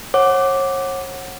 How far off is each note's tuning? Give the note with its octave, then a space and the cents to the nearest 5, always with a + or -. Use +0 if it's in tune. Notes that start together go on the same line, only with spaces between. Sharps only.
C#5 -35 F#5 +0 D6 -5